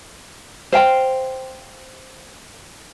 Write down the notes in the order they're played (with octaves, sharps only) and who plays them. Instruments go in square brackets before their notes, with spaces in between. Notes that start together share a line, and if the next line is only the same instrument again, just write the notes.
[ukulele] C5 F5 G5